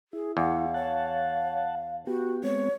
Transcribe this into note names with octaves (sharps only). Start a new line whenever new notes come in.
E4 G#4
E2 F5 F#5
C#5 F#5 A5
B3 F#4 G4
G#3 B3 C4 C#5